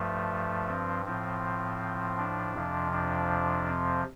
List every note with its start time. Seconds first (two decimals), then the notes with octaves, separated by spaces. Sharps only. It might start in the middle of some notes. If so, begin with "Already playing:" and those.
Already playing: G2 F3 A3
0.68 C4
1.05 A2 F3 C4
2.18 D4
2.55 F2 C3 F3
2.92 D4
3.68 C4